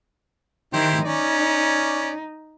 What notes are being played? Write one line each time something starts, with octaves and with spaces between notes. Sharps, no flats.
D#3 E4 G4 C5
C#4 D#4 D5